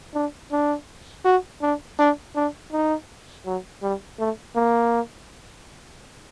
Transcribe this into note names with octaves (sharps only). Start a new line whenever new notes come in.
D4
D4
F#4
D4
D4
D4
D#4
F#3
G3
A3
A#3